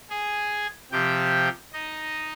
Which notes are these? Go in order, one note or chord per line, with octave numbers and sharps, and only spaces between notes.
G#4 G#5
C3 F3 G4 G5
D#4 D#5